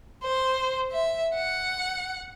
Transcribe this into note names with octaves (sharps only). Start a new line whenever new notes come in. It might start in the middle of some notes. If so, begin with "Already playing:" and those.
C5
E5
F#5